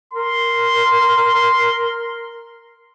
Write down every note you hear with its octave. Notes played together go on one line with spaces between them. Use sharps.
A#4 C6